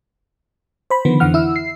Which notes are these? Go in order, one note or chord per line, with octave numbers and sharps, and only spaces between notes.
C5 B5
D3 D#3 F3 B3
F2 D3 E3 F#5 F6
E4 E6
C7